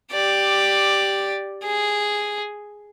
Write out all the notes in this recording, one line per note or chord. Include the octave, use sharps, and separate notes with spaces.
G4 D5
G#4